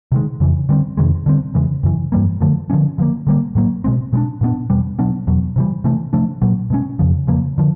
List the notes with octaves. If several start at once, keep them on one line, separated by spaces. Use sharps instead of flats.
C3 D#3 G#3
F2 C#3 E3
D3 G3 C4
F2 C3 D#3 G#3
D3 G3 C4
E2 C#3 E3 G#3
F#2 C#3 E3
G2 E3 G3 A#3
F#2 D3 F3 A3
D3 F3 G#3 C#4
D3 F3 A#3
D3 G3 A#3
A2 F#3 A#3
B2 G#3 C4
B2 G#3 B3 D4
A#2 G3 B3 D4
E2 B2 G3
B2 F#3 B3 D4
E2 B2 F#3
C3 E3 G3
C3 E3 A3
C3 F3 A3 D4
A#2 F#3 A#3
B2 G#3 C#4
F2 C#3 F3
E2 C#3 F3 A#3
D3 F3